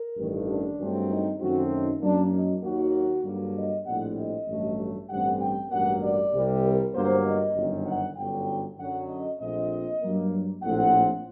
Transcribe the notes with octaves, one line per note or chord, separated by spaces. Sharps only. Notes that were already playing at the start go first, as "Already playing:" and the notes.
Already playing: A#4
A1 G2 D#3
D4
G2 D#3 F#3 A3 C4
D#4
F#2 D#3 A3 C4 F#4
D#4
F#2 F#3 A#3 D4
D#4
D#2 D#3 F#3 A#3 F#4
G2 D3 F#3 A#3
D#5
A#1 A2 G3 C4 F#5
D#5
A1 G2 F#3 A3
A1 G2 D3 G3 C4 F#5
G5
A1 G2 F#3 A#3 F#5
D5
C2 C3 G3
A#4
G1 G2 F#3 A#3 C5
D#5
G1 F#2 D#3
F#5
G1 F#2 D3 F#3 G5
F#2 D3 F#3 F#5
D#5
A#1 A#2 A3 C4 D#5
G2 F#3 A#3
A#1 A2 A3 C4 F#5